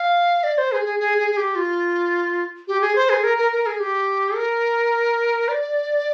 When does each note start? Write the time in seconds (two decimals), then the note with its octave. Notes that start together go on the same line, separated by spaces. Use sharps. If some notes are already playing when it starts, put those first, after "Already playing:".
Already playing: F5
0.44 D5
0.58 C5
0.72 G#4
0.85 G#4
1.00 G#4
1.18 G#4
1.31 G#4
1.37 G4
1.55 F4
2.68 G4
2.81 G#4
2.96 C5
3.10 G#4
3.24 A#4
3.38 A#4
3.52 A#4
3.66 G#4
3.80 G4
4.35 A#4
5.48 D5